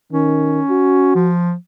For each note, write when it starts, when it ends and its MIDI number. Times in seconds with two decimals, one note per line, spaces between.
0.12 0.61 51
0.12 1.14 61
0.70 1.30 66
1.16 1.54 53